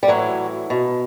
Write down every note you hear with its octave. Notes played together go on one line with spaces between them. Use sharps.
G3
A2 E3 F#3
B2